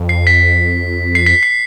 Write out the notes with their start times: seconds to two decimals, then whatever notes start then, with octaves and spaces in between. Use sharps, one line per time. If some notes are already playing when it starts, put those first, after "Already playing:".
Already playing: F2
0.09 C7
0.27 B6
1.15 C7
1.26 B6
1.43 C7